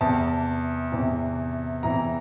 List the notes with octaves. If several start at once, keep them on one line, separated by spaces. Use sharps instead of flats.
E2 C3 E3 A5
E2 C3 E3
E2 C3 E3 A#5